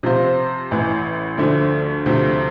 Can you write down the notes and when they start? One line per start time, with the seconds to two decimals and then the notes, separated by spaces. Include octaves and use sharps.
0.03 C3 F3 C4 F4 C5
0.71 A1 A2 E3
1.37 D2 D3 F3 A3
2.06 D2 C3 F3 A3